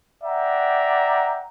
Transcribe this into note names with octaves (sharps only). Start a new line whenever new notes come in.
D5 E5 F#5 G5 A#5